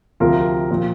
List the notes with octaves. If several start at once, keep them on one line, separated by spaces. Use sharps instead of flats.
D2 C3 F3 F4 A#4
A#2 F3